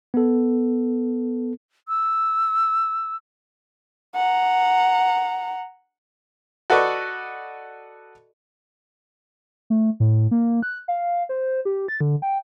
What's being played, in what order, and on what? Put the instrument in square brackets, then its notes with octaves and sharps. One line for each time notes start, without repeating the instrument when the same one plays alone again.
[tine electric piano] B3 A4
[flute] E6
[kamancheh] F#5 A#5
[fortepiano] F#4 A4 B4 D5 D#5 C#6
[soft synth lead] A3
A2
A#3
F#6
F5
C5
G4
A6
D3
G5